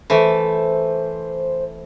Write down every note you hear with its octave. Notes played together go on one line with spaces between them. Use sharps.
E3 A3 C5